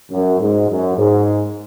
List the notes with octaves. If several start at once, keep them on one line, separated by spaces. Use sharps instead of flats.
F#2
G#2
F#2
G#2